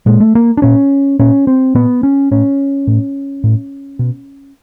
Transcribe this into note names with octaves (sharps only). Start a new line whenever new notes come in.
A#2 G#3
A3
A#3
D4
A#2 C#4
A#2 C#4
C4
A#2 B3
C#4
A2 C#4
A2
A2
B2